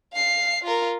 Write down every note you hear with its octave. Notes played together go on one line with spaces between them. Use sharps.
F5 C7
F4 A#4